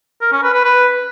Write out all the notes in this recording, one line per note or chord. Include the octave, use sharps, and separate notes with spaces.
A#4
C#4
B4
B4
B4